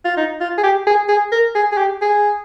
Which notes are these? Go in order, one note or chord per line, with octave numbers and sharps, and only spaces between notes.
F4
D#4
F4
G#4
G4
G#4
G#4
A#4
G#4
G#4
G4
G#4